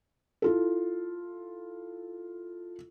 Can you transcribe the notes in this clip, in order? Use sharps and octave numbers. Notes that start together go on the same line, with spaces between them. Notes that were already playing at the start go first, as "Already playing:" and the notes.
E4 F4 A4